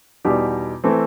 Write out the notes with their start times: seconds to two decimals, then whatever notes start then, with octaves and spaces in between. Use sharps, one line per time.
0.25 E2 B2 G3 D#4 G4
0.84 E3 A3 C4